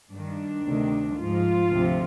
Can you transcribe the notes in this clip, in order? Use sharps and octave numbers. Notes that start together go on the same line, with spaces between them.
G2 D#3 D4
D2 C3 D#3
G#2 F3 F4
D2 C3 F3